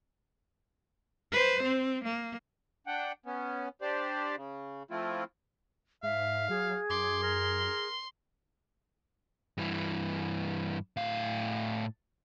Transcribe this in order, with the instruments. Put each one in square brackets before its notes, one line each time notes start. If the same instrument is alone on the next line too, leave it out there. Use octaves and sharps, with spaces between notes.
[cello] B4 C5
C4
A#3
[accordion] D4 F#5 G5
B3 C#4
D4 G4 C5 D5
C#3
F3 A3 C4 E4 F4
[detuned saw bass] G#2 [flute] E5 [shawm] F5
[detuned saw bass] F#3 [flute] G#4
[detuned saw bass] F#2 [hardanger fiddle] C6 [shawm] D6
[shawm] A#4
[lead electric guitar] G2 E3
A2 F5